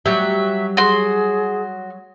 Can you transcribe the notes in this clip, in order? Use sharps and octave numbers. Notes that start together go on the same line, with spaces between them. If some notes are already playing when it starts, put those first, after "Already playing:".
F#3 G3 E5
F#4 G#4 C6